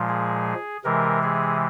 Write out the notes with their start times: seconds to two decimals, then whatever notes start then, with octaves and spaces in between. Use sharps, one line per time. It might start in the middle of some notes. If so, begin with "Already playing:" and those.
Already playing: A#2 F3 G#3
0.08 G#4
0.85 C3 E3 G#3 A#4
1.23 G#4